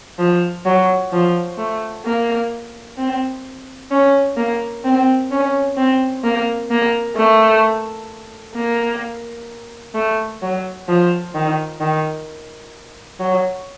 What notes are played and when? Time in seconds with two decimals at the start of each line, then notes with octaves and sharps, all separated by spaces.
0.19 F3
0.65 F#3
1.13 F3
1.58 A3
2.05 A#3
2.98 C4
3.91 C#4
4.37 A#3
4.84 C4
5.31 C#4
5.77 C4
6.24 A#3
6.70 A#3
7.16 A3
8.55 A#3
9.95 A3
10.42 F#3
10.89 F3
11.34 D#3
11.80 D#3
13.20 F#3